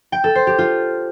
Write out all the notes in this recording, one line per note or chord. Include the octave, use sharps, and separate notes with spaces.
G5
A4
C5
G4
F4